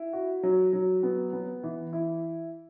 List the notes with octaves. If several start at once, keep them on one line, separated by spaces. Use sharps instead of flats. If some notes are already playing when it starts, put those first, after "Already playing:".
Already playing: E4
F#4
F#3
F#3
B3
B3
E3
E4